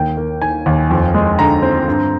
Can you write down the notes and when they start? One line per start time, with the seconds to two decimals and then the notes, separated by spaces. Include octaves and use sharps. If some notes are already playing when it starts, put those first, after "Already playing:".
Already playing: D#2 A#3 G5
0.17 A#3
0.42 D#3 G#5
0.66 D#2
0.90 F2
1.14 G#3
1.39 D3 A#5
1.62 C4
1.88 G2